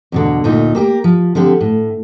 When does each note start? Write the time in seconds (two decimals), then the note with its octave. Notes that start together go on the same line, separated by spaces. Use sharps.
0.12 E2 B2 D3
0.44 D2 A#2 D#4
0.75 A#3 G4 G#4 A#4
1.04 F3
1.35 D3 F3 C4 G4
1.61 A2